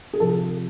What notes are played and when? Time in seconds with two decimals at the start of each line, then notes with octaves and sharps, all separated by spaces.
0.13 G#4
0.20 C3 F3 A4